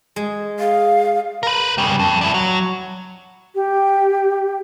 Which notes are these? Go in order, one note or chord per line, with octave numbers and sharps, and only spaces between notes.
G#3
G#4 F5
A#4 B4
C#3 G3
F2
D4 E4
F#3
G4